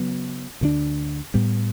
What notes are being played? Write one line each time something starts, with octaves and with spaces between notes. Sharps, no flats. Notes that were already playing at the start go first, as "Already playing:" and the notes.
Already playing: C#3 F#3 B3
D2 D3 A3 D4
A2 G3 B3